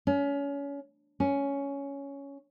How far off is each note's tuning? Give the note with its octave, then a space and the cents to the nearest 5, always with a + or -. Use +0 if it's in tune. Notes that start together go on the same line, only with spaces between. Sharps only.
C#4 +30
C#4 +10